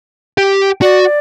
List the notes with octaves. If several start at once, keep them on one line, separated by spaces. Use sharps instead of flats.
G4
F#4 D5